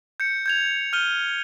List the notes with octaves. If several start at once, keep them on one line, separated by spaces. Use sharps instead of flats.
G6 C#7
G6 G#6 F7
F6 G6 D#7 G7